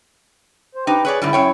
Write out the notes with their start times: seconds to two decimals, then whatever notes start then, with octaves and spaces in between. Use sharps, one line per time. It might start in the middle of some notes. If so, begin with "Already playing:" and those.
0.75 C5
0.87 D#4 G4 B4 G5
1.05 G#4 B4 C#5 D5
1.22 G#2 D3 G3 E4
1.33 F#2 C#5 G5